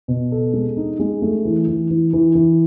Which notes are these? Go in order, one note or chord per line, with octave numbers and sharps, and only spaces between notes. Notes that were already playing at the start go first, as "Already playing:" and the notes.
B2
A4
G#3
D#4
G#3
A3
E3
E3
E3
E3
E3